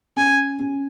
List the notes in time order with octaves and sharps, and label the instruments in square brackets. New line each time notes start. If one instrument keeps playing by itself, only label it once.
[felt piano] C#4 [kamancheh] G#5
[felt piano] C#4